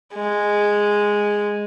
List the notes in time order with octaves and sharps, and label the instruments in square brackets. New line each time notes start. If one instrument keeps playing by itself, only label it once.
[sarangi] G#3